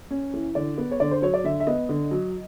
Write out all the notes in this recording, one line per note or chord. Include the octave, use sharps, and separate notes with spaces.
C#4
E3
D3 D5
B3
C#5
D3 D5
C5
F#3 C#5
D5
D3 E5
E5
B3 D#5
D3
F#3